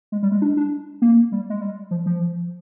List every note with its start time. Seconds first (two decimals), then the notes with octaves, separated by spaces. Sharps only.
0.12 G#3
0.23 G3
0.32 G#3
0.42 D4
0.57 D4
1.02 A#3
1.32 G3
1.50 G#3
1.61 G3
1.91 F3
2.06 F3